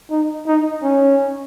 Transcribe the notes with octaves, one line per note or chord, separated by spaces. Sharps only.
D#4
D#4
C#4